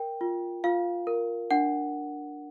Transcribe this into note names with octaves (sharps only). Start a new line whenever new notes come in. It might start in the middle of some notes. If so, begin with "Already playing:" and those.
Already playing: A#4 G5
F4
F4 F5
A#4
D4 F#5